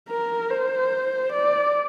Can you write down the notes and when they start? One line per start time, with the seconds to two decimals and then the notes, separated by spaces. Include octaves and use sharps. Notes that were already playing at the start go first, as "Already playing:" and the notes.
0.09 A#4
0.51 C5
1.33 D5